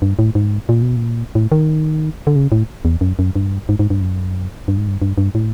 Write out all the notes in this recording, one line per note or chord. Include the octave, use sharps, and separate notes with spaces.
G2
A2
G#2
A#2
B2
A#2
A2
D#3
D3
C#3
A2
E2
F#2
F#2
G2
G#2
G#2
G2
F#2
G2
G#2
G2
G2
G2
A2